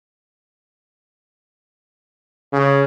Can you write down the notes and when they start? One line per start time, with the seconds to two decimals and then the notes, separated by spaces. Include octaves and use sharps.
2.53 C#3